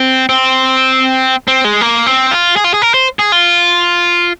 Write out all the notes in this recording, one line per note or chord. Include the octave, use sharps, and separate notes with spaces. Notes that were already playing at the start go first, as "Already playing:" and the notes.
Already playing: C4
C4
C4
G#3
A#3
C4
F4
G#4
F4
G#4
A#4
C5
G#4
F4